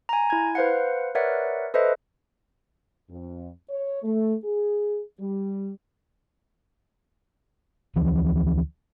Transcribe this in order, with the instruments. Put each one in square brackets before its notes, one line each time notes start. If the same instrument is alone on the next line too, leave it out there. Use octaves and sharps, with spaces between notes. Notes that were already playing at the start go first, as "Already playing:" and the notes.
[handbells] G#5 A#5
E4 G#6
B4 C5 F5 F#5
A#4 B4 C#5 D5 E5 F#5
A4 B4 C5 D#5 E5
[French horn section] F2
C#5
A3
G#4
G3
[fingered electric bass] D2 E3 F3